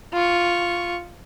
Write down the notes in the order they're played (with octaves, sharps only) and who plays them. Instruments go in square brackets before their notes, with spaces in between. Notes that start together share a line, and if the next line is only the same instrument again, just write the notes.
[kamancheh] F4 C#6